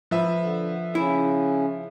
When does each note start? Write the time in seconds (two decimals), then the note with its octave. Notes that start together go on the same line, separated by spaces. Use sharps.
0.11 F3 B4 E5
0.40 D3
0.95 C#3 C#4 E4